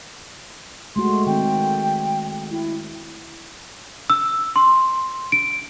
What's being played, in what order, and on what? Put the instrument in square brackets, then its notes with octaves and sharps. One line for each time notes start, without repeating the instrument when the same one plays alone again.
[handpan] G#3 A3 F#4 [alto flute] C6
[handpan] D#3 C4 [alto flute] G5
[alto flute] E4
[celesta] E6
C6
D7